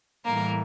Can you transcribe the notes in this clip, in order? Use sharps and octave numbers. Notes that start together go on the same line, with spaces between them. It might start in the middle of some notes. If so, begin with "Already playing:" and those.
A2 E3 G3 A#3 A#4